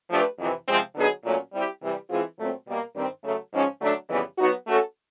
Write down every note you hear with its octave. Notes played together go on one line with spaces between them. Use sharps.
F3 A3 D4 G4 B4
F2 C3 E3
C3 F3 G#3 C4
D3 F#3 B3 D#4 G#4
A#2 F#3 A3 C#4
G3 C4 E4 G4
C3 E3 G3
E3 G#3 C4 F4 G#4
A#2 F#3 A3 C4
B2 G3 A#3
G2 D#3 G3 C4
C#3 F#3 A3
G#2 F3 G#3 C#4
D3 F#3 A3 D4
F2 C#3 E3 G3 B3
F#3 B3 D#4 F#4
A3 C#4 F#4 A4